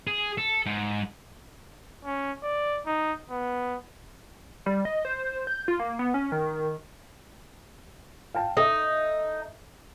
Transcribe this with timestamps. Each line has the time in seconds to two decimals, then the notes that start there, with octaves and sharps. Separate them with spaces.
0.07 G#4
0.38 A4
0.66 G#2
2.05 C#4
2.43 D5
2.86 D#4
3.30 B3
4.66 G3
4.85 D#5
5.05 C5
5.47 G6
5.68 F4
5.80 A#3
5.99 B3
6.14 C#4
6.32 D#3
8.34 F5 G5 A5
8.57 D#4 A4 D#5 E5